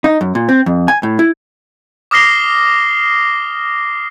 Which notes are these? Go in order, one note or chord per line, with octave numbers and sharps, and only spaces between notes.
D#4
F#2
A#2
C4
F2
G#5
A2
E4
D6 D#6 F6 A#6 C7 G7